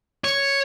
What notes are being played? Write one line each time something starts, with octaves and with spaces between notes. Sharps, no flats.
C#5